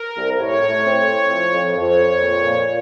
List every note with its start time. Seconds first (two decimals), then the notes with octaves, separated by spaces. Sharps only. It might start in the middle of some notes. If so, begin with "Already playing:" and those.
Already playing: A#4
0.16 C2
0.38 A2 C#5
0.61 A2
0.84 C4
1.07 A2
1.30 F2
1.53 F2
1.76 F2 C#5
1.99 F2
2.21 A#2
2.44 A#2